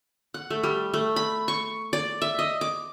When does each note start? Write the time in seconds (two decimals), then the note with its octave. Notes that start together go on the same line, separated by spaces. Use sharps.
0.34 F#5
0.50 A3
0.64 G3
0.94 A3
1.16 B5
1.48 C#6
1.93 D5
2.22 E5
2.39 D#5
2.61 D6